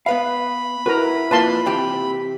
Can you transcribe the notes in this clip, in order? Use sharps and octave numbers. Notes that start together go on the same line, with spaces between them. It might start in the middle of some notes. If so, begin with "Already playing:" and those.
B3 B4 F5 B5
E4 F#4 A#4 B4 A#5
F2 A#3 F4 B4 A5 C6
C3 E3 C4 G4